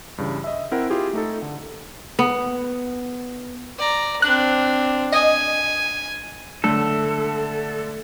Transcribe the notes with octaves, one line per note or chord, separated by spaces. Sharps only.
G2 C#3 E3
D#5 E5
C4 E4 A#4 F#5
E4 F4 G4 G#4
A3 D#4 A4
D3
B3
D5 A#5
C4 D4 F#6
D#5 G#5
D3 A3 A4